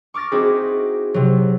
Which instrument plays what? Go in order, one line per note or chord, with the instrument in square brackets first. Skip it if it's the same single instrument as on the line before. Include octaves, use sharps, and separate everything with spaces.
[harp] C#6 D6 F6 A6 A#6
C4 D#4 E4 F#4 G#4
C3 F#3